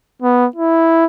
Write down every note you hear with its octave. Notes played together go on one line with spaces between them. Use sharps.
B3
E4